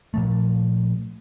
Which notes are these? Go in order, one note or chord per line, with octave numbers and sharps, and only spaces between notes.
A#2 F3 A3